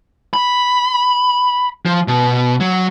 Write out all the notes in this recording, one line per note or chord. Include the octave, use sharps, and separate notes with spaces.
B5
F3
B2
F#3